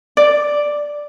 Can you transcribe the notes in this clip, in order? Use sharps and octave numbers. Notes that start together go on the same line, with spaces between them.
D5